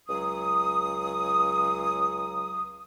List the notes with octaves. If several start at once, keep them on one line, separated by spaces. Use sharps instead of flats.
C#2 F#3 D#6